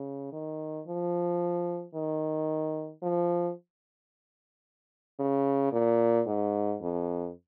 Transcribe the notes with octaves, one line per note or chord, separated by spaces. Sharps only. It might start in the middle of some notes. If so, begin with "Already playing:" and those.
Already playing: C#3
D#3
F3
D#3
F3
C#3
A#2
G#2
F2